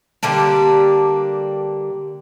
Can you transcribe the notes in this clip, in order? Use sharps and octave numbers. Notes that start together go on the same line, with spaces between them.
D3 G3 A#3 D4